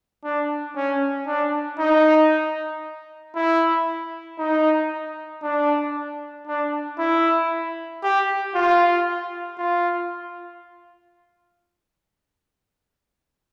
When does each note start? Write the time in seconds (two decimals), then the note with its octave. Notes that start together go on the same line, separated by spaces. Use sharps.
0.24 D4
0.76 C#4
1.27 D4
1.79 D#4
3.35 E4
4.39 D#4
5.43 D4
6.48 D4
6.99 E4
8.04 G4
8.55 F4
9.59 F4